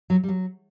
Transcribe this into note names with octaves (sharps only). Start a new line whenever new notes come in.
F#3
G3
F#3